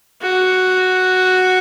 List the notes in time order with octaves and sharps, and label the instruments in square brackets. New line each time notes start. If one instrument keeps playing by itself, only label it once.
[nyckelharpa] F#4